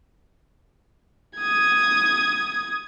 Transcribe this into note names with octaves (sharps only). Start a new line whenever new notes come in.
D#6 G#6